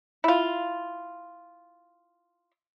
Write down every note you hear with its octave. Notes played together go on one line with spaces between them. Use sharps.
E4 F4